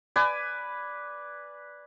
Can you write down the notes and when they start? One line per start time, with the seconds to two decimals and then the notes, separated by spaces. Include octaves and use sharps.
0.16 B4 D5 G#5